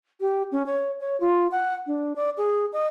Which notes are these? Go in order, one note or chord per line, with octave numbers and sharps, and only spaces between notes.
G4
C#4
C#5
C#5
F4
F#5
D4
D5
G#4
D#5